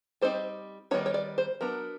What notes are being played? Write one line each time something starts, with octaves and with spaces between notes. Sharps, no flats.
G3 C4 D#4 C5
D#3 G3 B3 D#4 C#5
C#5
D5
C5
F#3 B3 D4 A#4